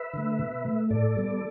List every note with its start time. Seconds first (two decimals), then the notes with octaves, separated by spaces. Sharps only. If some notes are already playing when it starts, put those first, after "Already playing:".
Already playing: B4 E5
0.13 D3 A3
0.39 B2
0.65 A3
0.90 A2 A4 D5
1.16 G3 B3